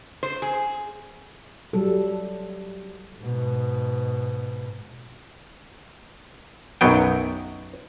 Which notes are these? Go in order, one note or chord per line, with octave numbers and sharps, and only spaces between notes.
C5
G#4
F#3 G3 A4
G#2 B2
B1 F#2 F#3 B3 G5